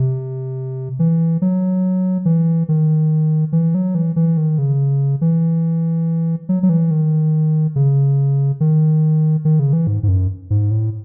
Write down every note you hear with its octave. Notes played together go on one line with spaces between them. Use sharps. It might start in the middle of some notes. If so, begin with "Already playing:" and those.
Already playing: C3
E3
F#3
E3
D#3
E3
F#3
E3
E3
D#3
C#3
E3
F#3
F#3
E3
D#3
C#3
D#3
D#3
C#3
E3
G#2
G#2
F#2
G#2
A2